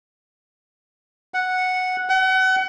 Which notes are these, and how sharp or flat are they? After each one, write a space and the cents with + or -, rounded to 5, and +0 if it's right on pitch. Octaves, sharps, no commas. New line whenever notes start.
F#5 -5
F#5 +35